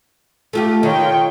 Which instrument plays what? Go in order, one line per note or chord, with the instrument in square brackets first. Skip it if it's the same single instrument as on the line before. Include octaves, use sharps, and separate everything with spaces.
[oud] A3 F4 G4
[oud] D#3 [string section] F4 C#5 G5